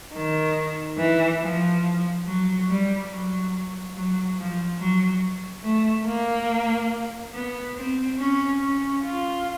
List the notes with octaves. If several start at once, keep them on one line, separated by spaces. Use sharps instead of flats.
D#3
E3
F3
F#3
G3
F#3
F#3
F3
F#3
A3
A#3
B3
C4
C#4
C#4
F4